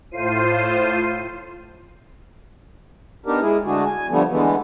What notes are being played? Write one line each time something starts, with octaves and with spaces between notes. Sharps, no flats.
A2 F4 C5 C7 D#7
B3 D4 D#4 G4 A#4
G#3 E4 G#4
D3 G#3 A3 D4 F#4 G#4
G#5
D3 F3 G3 A3 B3
D3 E3 G#3 A3 B3